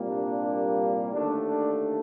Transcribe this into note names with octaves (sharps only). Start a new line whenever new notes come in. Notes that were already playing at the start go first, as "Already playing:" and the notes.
Already playing: C2 A#2 G3 A#3
D4
D#2 D3 A3 D4
D4